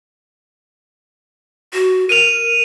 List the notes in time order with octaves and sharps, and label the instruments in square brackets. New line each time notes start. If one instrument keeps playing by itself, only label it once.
[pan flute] F#4
[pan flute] A#4 [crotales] D#7 F7